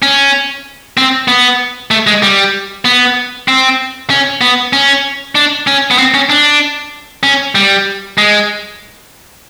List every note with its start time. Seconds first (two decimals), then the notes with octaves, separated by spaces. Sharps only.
0.02 C#4
0.97 C4
1.28 B3
1.91 A3
2.07 G#3
2.23 G3
2.85 B3
3.48 C4
4.10 C#4
4.41 B3
4.73 C#4
5.35 D4
5.67 C#4
5.91 B3
5.99 C4
6.14 C#4
6.30 D4
7.23 C#4
7.55 G3
8.18 G#3